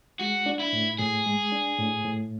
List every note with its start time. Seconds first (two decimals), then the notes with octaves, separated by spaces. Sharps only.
0.19 G#3 F#4
0.46 D4
0.59 E4
0.73 A2
0.98 A2 G#4
1.26 G#3
1.52 D4
1.78 A2
2.05 A2